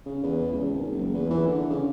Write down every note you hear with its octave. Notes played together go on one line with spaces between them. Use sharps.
C#3
E2
C#2
G#1
F#1
E2
E3
D3
C#3